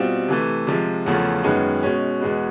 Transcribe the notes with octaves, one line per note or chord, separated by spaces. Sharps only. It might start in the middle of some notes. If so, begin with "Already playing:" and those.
Already playing: B2 G3 C4 F4
C3 E3 A3
C3 F3 G#3
E2 C#3 F3 A3
F#2 D#3 G#3 B3
B2 G#3 C#4
E2 B2 G#3 B3